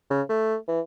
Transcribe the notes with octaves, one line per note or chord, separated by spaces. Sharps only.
C#3
A3
E3